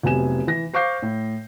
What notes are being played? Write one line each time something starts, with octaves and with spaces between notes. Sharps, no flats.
F1 C3 F#3 B3 G#5 E7
E3 A#6
C5 F5 C#6 D6 G6 C7
A2